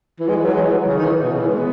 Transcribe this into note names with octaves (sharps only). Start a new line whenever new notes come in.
E3
G#3
E3
F#3
G#3
E3
F#3
C#3
D#3
E3
B2
C#3
E3
G#3
B3